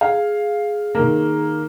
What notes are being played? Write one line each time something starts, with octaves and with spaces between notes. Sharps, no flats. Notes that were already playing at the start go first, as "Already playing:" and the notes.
G#4 F5
D#3 A#3